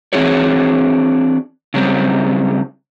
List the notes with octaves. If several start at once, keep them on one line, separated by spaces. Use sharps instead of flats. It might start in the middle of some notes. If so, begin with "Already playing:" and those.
E3 C4 D4 F#4 G#4 C#5
C#3 F#3 G3 C4